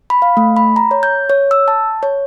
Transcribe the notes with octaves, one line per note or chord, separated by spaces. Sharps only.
B5
F5
A3
B5
A#5
C#5
G6
C#5
E6
A5
C#5